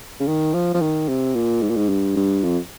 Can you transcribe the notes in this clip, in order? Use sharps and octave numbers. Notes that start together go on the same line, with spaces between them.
C#3
D#3
F3
F3
D#3
C3
A#2
G#2
A#2
G#2
G2
G2
F2